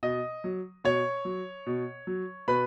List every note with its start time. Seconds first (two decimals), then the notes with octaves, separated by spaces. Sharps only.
0.03 B2 D#5 D#6
0.44 F#3
0.84 B2 C#5 C#6
1.25 F#3
1.66 B2
2.07 F#3
2.47 B2 B4 B5